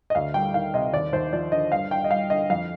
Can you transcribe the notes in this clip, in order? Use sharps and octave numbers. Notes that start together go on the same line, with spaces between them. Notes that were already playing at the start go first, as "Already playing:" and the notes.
D#5
D2 F5
G3 G5
D#3 F5
C3 D#5
D#2 D5
D#2 C5
F3 D5
D3 D#5
G2 F5
G2 G5
D#5
G3 F5
D3 D#5
F2 F5